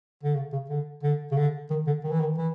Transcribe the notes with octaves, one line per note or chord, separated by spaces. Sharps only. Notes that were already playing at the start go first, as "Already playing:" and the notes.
D3
C#3
C#3
D3
D3
C#3
D3
D#3
D3
D#3
E3
D#3
E3